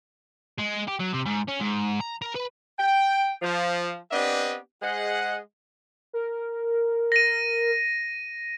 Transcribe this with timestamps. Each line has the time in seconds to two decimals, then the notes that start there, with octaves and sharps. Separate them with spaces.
0.58 G#3
0.88 G4
1.00 F#3
1.14 C3
1.26 G#2
1.48 C#4
1.61 G#2
2.01 A#5
2.22 A#4
2.35 B4
2.79 G5
3.42 F3
4.12 B3 C4 D4 G4 B4 D#5
4.81 G#3 G#4 C5 D#5 F#5
6.13 A#4
7.12 A#6 D#7